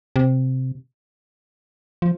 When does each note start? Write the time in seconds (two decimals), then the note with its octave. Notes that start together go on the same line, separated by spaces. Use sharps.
0.16 C3
2.02 F3